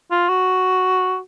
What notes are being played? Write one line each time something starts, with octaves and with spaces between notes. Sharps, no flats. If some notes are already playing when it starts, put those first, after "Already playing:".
F4
F#4